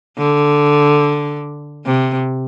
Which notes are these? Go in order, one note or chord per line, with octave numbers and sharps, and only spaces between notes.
D3
C3